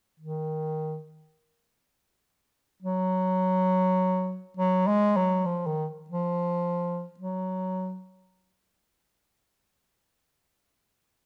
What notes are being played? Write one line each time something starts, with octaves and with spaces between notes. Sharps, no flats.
D#3
F#3
F#3
G#3
F#3
F3
D#3
F3
F#3